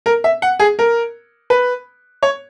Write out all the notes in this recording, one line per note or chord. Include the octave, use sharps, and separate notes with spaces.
A#4
E5
F#5
G#4
A#4
B4
C#5